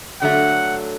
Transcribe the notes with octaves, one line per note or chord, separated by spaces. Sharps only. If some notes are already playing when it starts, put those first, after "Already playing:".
D3 F#3 A3 F#5